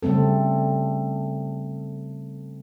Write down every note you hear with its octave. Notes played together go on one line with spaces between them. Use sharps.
C#3 G3 A3 C4 A4